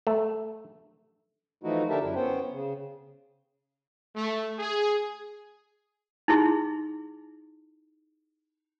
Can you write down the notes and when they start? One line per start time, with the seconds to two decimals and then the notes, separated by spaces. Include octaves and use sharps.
0.07 A3
1.64 E3 F3 A3 D#4 E4 F#4
1.90 D3 D4 G4 A#4 E5 A5
2.02 F#2 E4
2.16 B3 C#4 C5 G5
2.52 C#3
4.16 A3
4.59 G#4
6.28 D#4 E4 G#4 C6